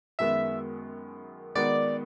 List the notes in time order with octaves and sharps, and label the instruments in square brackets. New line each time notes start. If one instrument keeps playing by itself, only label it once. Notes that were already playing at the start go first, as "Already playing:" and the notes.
[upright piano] F#2 D#3 G#3 B3 [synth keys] E5
[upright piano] D#3 G#3 B3 D#4 F#4 [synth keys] D5